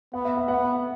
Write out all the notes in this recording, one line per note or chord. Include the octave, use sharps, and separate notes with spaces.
B3 F#5
E5
F#5
B3 F#5